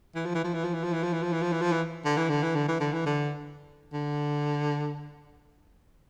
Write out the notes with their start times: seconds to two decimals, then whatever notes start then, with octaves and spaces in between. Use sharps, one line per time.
0.15 E3
0.25 F3
0.35 E3
0.44 F3
0.54 E3
0.64 F3
0.74 E3
0.84 F3
0.93 E3
1.03 F3
1.13 E3
1.23 F3
1.33 E3
1.42 F3
1.52 E3
1.61 F3
1.72 E3
2.05 D3
2.17 E3
2.30 D3
2.43 E3
2.55 D3
2.68 E3
2.80 D3
2.93 E3
3.06 D3
3.93 D3